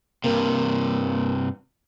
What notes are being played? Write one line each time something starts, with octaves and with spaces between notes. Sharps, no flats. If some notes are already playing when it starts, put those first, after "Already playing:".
G2 C3 A#3 A#4